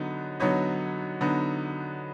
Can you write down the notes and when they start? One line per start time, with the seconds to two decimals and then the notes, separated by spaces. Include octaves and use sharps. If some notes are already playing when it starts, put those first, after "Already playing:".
Already playing: D3 F#3 B3 D#4
0.40 D3 F#3 B3 D#4 C#5
1.21 D3 F#3 B3 D#4